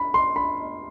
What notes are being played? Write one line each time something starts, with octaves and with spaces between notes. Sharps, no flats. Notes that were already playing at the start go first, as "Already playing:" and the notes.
Already playing: B5
C6
B5